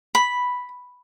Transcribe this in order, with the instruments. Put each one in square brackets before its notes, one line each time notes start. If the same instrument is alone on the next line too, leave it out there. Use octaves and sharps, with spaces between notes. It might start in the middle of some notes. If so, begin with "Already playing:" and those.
[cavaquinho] B5